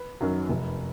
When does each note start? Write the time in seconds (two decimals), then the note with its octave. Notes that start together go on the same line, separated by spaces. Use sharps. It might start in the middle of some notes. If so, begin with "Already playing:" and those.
Already playing: B4
0.21 F#2 D#3 F#3
0.49 F1